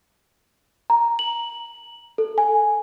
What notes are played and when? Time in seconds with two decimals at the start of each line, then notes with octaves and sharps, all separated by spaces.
0.90 A#5
1.19 F#7
2.18 A4
2.38 G#5